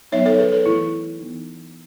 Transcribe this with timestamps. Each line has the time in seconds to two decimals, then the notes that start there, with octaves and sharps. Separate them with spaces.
0.12 F#3 B3 D#4 C#5 E5
0.26 A4 C#5
0.38 G#4 B4
0.52 A4 C#5
0.66 E3 A3 E4
1.19 E3 B3 D#4